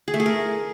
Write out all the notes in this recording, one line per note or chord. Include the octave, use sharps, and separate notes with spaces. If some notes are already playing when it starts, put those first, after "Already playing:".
G#4
A3
G#4
A#4